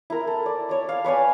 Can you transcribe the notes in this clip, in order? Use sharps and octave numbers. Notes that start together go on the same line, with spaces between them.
E4 A#4
A4
D5
C#5 D5
F5
B4 C#5 D5 G#5